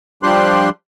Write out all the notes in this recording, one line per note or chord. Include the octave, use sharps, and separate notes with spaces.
F3 G3 D4 G4 C6 F#6